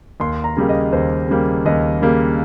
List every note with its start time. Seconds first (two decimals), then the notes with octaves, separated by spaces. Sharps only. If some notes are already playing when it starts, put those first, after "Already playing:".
0.20 D#2 C6
0.44 A#5
0.57 C#3 G3 A#3
0.69 D#5
0.93 D#2 C5
1.29 C#3 G3 A#3
1.66 D#2 D#5
2.02 C#3 G3 A#3